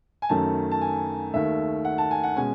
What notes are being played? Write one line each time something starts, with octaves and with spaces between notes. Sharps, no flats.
G#5
F#2 D#3 A3 C#4 A5
A5
G#5
D#2 D#3 A3 E5
F#5
A5
G#5
F#5
B2 G#3 C#4 G#5